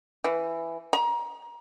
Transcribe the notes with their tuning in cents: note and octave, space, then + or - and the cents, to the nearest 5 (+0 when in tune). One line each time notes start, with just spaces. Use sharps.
E3 +10
A#5 +30